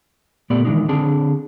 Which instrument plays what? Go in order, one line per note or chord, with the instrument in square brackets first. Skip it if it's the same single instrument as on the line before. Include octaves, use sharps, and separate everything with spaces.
[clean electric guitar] A#2 A3 B3 G4 D5 B5
D#3 E3 F#3 G#3 D4 D#4
D3 C4 D4 G#4 A5